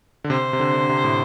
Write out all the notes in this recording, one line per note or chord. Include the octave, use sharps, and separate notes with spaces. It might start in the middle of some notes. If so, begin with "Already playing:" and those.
D3
C3 C5
C3
D3
D3
C3
A2